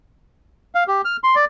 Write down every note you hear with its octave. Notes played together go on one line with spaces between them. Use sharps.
F5
G4
F6
C6
D5